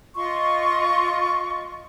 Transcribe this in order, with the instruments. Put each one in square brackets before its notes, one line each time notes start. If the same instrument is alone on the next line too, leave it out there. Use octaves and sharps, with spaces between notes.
[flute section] F4 D#5 C6 C#6